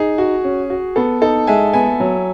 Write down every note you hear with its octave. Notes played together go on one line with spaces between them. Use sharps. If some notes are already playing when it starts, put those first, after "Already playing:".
Already playing: D#4 G#4
F#4
C#4
F#4
B3 A4
D#4 A4
G#3 E5 G#5
B3 E5 G#5
F#3